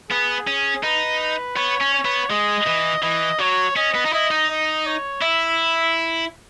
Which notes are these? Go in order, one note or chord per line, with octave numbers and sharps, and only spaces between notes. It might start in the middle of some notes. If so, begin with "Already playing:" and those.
B3 G#4
C#4
D#4 B4
B3 C#5
C#4
C#5
B3
G#3 D#5
E3
E3 D#5
F#3 C#5
C#4 D#5
B3
D#4
E4 D#5
D#4
D#5
C#5
E4 E5